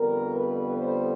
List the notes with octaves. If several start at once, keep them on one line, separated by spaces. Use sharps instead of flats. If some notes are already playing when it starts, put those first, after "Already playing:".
Already playing: F2 D3 G3 B3 A#4
B4
C5